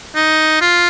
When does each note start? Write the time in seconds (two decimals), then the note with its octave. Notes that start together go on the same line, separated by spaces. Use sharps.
0.15 D#4
0.61 F4